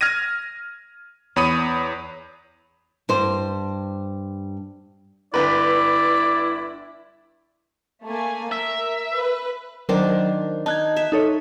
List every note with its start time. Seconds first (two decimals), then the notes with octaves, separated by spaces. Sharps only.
0.01 F6 G#6 A#6 D#7
1.36 E2 C#5 B5 D#6 D#7
3.09 G2 C5
5.34 G1 E4 B4 D5
8.05 A3 A#3 G#5
8.52 A#4 E5
9.16 B4
9.89 D#3 F#3 D4 A#4 C5
10.66 D#4 A5 F#6 G#6
10.96 E5
11.12 D#4 A4 C#5